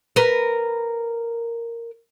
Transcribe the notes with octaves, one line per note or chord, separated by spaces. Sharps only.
A#4 B4